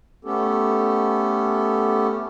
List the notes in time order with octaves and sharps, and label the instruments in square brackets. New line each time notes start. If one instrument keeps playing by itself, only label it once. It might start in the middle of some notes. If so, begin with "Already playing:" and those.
[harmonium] A3 B3 C#4 G4 A4